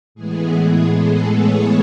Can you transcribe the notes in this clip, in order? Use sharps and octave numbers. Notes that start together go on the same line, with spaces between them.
A2 E3 G#3 B3 G#4
A4
C#5